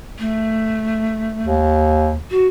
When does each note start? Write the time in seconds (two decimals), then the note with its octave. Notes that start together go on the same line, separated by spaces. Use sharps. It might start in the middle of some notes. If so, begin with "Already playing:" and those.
0.19 A3
1.44 D#2
2.31 F#4